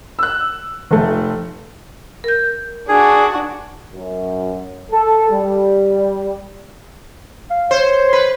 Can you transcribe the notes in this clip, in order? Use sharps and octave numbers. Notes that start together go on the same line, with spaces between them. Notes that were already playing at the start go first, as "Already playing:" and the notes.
E6 F#6
F1 A3
A#4 G6
D4 F#4 G#4
F#2
A4
G3
F5
C5 C#5
B4